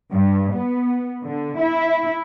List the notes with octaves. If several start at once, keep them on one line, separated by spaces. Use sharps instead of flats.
G2
B3
D3
E4